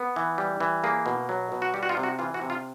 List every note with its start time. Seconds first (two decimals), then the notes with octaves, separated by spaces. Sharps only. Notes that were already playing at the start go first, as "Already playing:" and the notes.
Already playing: B3
0.16 E3
0.38 G3
0.60 E3
0.84 A#3 G#4
1.06 B2
1.29 F#3
1.52 B2
1.62 F#4
1.74 G3 G4
1.83 F#4
1.89 F4
1.97 C3
2.03 F#4
2.19 E3 F4
2.34 F#4
2.41 C3
2.50 F4